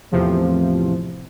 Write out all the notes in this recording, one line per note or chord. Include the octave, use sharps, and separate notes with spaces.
E2 A2 C3 F3